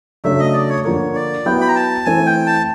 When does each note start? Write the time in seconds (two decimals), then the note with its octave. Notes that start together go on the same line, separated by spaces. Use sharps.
0.24 C#3 F#3 A3 D4 E5
0.39 D#5
0.54 D5
0.69 C#5
0.84 D3 F3 A#3 C#5
1.15 D5
1.46 F#3 B3 E4 G5
1.61 B5
1.68 A#5
1.76 A5
2.05 E3 A3 C4 G#5
2.26 G5
2.47 A5